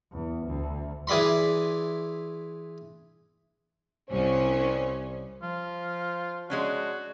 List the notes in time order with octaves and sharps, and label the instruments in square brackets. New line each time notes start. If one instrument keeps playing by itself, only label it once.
[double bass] E2
D2
[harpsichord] E3 G#4 D5 B5 C6
[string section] C2 C#4 [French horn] C5
[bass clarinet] F3 [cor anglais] F4
[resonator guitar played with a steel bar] G#3 C#4 D4 [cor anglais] F#4